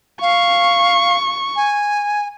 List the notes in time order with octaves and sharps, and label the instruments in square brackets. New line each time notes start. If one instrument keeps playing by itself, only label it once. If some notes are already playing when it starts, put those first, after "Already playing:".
[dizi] F5 [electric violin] C#6
[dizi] G#5